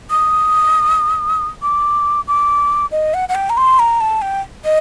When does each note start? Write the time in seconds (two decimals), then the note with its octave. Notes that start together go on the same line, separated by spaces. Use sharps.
0.10 D#6
1.62 D6
2.28 D6
2.91 D#5
3.14 F#5
3.29 F#5
3.35 G5
3.50 A#5
3.57 C6
3.79 A#5
4.01 A5
4.22 G5
4.65 D#5